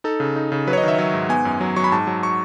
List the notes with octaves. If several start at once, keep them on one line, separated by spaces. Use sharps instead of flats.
D#4 A4
C#3
D#4
C#3
F#3 B4
C#5
D#5
D#3 E5
F#3 E5
G#2
B3 G#5
F#2
F#3
F#3 C#6
B5
G#2 A5
F#3
C#6